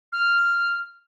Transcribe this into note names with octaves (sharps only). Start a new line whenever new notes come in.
F6